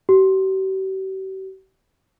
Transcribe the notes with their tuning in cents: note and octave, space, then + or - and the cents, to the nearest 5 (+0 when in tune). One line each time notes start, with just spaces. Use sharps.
G4 -45